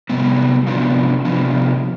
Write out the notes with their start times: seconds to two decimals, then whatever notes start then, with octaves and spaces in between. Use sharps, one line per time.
0.09 C3 G3 B3
0.67 C3 F3 B3 D4 F4
1.25 C3 F3 B3 D4 F4